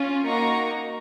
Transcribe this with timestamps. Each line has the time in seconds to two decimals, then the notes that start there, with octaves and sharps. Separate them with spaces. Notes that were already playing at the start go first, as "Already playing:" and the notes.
Already playing: C#4 F4
0.25 A#3 D#4 F#4 A#5 C#6